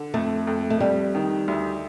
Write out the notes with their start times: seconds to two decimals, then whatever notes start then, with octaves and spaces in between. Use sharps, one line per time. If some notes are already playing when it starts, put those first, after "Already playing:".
Already playing: D3
0.14 F2 A3
0.47 F2
0.70 A3
0.80 F2 G3
1.15 D#3
1.48 D2